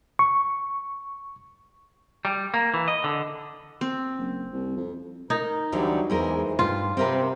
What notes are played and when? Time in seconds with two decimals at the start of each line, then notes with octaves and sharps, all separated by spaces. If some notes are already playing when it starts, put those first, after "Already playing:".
0.19 C#6
2.25 G3
2.54 A#3
2.74 E3
2.88 D#5
3.04 D3
3.81 C4
4.18 F#1
4.52 C2
4.77 F2
5.30 D#4 A#4
5.72 D2 D3 E3 F#3 G3
6.10 A#1 E2 E3 G#3 A#4 C5
6.59 G2 F4
6.97 C3 C4 A#4 B4